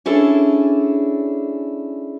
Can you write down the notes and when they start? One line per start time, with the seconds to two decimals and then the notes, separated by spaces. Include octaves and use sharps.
0.06 C#4 D4 E4 G#4 A4 D5